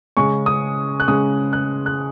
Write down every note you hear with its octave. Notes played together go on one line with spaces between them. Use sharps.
C#3 G#3 C#4 C#6
D#6
F#6
C#3 G#3 C#4 D#6
F#6
F#6